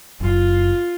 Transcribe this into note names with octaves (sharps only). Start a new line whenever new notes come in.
F#1 F4